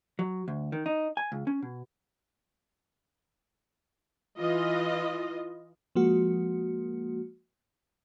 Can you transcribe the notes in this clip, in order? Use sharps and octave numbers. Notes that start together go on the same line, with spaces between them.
F#3
D2
D#3
D#4
G#5
C#2
C#4
B2
E3 F4 D#5
F3 G#3 A#3 F#4